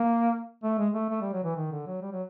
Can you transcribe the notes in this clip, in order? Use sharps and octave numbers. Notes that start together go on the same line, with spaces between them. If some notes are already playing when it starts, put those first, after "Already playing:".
Already playing: A#3
A3
G#3
A3
A3
G3
F#3
E3
D#3
D3
F#3
G3
F#3